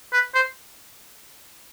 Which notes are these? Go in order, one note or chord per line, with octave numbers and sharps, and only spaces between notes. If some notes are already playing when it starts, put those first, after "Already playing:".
B4
C5